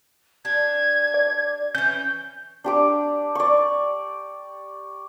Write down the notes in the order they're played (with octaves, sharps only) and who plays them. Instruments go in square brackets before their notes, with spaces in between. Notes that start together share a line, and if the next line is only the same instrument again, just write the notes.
[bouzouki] D4 G4 [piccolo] G#6
[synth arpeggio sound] D5
[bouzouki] E3 C#4 [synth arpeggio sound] G6
[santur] D4 G4 D6
D5 C#6